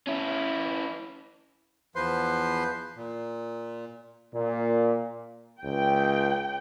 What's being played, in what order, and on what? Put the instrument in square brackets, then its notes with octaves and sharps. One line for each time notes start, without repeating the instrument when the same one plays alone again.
[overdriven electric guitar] C#4 E4
[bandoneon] E2 F3 B4 C5 C6
A#2
[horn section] A#2
[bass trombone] C#2 [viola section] G5